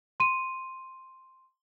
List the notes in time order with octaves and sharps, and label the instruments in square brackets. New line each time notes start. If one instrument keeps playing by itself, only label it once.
[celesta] C6 D#7